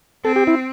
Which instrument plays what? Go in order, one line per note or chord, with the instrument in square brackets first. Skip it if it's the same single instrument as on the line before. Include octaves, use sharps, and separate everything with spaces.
[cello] C4 [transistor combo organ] A4
[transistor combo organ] G4
E4